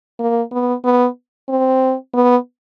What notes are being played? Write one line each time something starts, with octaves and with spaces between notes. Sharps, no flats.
A#3
B3
B3
C4
B3